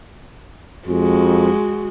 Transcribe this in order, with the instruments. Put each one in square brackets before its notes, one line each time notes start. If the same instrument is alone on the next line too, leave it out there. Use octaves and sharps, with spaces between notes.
[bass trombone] F2 [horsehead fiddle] G#3 F#4